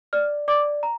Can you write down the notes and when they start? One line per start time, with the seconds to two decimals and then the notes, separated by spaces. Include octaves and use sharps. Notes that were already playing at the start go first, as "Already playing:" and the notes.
0.13 D5 F6
0.48 D5 D6
0.83 A#5